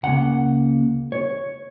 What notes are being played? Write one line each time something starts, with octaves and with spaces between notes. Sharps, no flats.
C#2 C#3 A#3 F#5
C#5